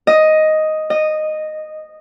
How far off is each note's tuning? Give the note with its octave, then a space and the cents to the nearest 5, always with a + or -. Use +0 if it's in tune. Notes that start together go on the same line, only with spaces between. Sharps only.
D#5 +5
D#5 -10